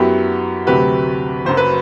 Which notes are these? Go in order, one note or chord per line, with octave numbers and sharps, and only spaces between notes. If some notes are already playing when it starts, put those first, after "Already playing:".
Already playing: F#2 F#3 B3 E4 G4
D2 C3 F#3 G4 B4
F#1 F#2 F#3 C5
B4